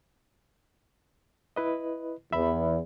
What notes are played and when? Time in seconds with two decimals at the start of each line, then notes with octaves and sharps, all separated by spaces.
1.56 E4 B4 D#5
2.33 E2 E5 B5